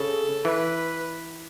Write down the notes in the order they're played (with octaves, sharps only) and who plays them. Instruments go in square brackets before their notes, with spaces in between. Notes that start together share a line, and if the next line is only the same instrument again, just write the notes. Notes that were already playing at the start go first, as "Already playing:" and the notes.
Already playing: [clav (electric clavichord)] C#3 [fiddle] A4
[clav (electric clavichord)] E3 [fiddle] B4